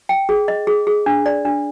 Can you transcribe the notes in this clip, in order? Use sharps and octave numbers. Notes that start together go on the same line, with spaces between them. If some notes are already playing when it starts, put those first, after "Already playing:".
G5
G#4
D#5
G#4
G#4
D4
D5
D4